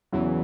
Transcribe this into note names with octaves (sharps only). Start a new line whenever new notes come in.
E1 E2 C#3 E3 F#3